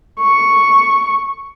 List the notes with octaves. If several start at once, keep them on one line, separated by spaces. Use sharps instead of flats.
C#6